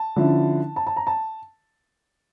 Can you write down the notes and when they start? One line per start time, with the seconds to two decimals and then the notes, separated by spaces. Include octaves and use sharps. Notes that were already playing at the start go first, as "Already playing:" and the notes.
Already playing: A5
0.16 D3 F3 C#4 E4
0.76 A5
0.87 A5
0.96 A#5
1.07 A5